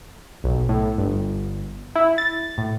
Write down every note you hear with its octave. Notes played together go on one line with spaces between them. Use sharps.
B1
A2
G1
E4
A6
A2